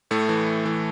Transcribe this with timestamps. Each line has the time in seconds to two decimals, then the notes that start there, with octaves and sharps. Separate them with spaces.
0.11 A2 A3
0.29 E3
0.66 E3